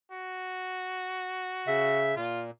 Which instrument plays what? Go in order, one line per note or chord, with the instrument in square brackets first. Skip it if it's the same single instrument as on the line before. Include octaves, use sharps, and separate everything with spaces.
[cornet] F#4
[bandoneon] C#3 E5
[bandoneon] A#2 [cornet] F4